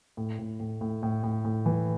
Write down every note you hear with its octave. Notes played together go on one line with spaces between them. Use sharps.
A2
A2
A2
A2
A2
A2
A2
E3